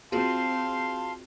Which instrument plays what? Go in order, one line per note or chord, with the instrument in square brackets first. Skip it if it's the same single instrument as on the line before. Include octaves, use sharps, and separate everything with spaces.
[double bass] C4 [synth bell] F4 F#4 G#4 [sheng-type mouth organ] F5 C6 [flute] A5